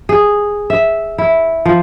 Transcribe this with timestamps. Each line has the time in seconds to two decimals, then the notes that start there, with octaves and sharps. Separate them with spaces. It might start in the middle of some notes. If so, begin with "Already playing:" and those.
0.09 G#4
0.70 E5
1.18 E4
1.65 F3